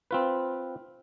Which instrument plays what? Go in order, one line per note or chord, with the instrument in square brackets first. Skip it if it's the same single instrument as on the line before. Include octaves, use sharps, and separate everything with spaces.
[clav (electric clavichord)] C4 F4 B4